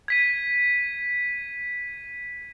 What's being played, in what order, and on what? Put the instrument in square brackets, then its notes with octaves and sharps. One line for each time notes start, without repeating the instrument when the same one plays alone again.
[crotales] G#6 B6 D#7